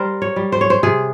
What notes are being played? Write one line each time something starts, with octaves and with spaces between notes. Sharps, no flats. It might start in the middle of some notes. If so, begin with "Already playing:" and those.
Already playing: G3 A#4 C5
C#5
G3
C5
C#5
C5
C3 G#4